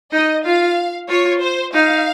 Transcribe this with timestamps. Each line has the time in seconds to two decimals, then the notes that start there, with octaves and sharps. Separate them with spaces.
0.13 D#4 D#5
0.45 F4 F5
1.09 F4 C#5
1.42 C5
1.74 D#4 F5